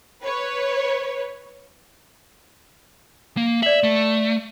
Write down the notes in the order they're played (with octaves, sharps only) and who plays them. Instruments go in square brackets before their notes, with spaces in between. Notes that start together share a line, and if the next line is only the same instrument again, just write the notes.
[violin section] B4 C#5
[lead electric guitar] A#3
[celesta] D5 F#7 [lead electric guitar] E5
[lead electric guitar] A3